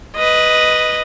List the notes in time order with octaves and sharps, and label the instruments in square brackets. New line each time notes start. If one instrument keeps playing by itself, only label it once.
[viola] B4 D#5